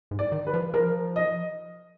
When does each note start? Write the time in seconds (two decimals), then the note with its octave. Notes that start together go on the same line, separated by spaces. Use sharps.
0.11 G#2
0.19 D5
0.32 D#3
0.47 B4
0.54 F3
0.74 F3 A#4
1.16 D#5